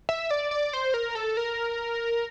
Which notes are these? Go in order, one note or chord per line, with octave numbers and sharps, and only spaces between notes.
E5
D5
D5
C5
A#4
A4
A#4